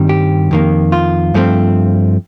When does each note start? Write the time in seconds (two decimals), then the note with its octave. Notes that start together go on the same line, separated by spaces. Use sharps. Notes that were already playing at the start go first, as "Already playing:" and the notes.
Already playing: G2 D#3 G3 C4
0.09 G4
0.51 F2 D#3 A#3
0.92 F4
1.34 G2 F3 A3 C4